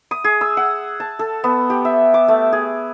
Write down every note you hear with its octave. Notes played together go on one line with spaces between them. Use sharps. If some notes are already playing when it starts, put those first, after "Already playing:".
D#6
G#4
E6
F#5
A5
A4
B3
G4
E5
D6
A3
G#4